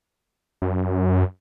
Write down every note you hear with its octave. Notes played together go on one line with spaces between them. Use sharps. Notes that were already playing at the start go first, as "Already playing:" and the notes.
F#2